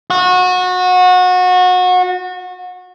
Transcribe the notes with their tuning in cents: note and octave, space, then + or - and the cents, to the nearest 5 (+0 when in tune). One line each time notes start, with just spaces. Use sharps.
F#4 -25